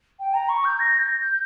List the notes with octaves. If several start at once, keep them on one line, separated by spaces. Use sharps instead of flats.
G5
A#5
C#6
G6
A#6
G6
G6